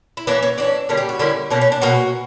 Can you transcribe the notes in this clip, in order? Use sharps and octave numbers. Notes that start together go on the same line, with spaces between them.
E4
E3 A#3 C#4 D4
C#4
E3 A#3 C#4 D4
D3 G3 A#3 C#4
G4
F#4
D3 G3 A#3 C#4 E4
B2 A#3 C#4 D4
C#4
D4
B2 A#3 C#4 F#4